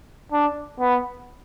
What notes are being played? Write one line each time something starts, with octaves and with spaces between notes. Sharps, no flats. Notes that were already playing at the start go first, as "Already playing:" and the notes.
D4
B3